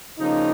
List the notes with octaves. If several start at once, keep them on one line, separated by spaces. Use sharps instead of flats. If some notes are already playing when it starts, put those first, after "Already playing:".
C#3 F3 A#3 D#4